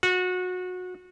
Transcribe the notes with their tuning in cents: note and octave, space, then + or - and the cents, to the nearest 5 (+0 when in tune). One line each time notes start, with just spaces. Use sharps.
F#4 -25